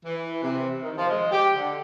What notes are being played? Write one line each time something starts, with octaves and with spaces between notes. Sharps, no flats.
E3
C3
D#3
F3
G#3
G4
D3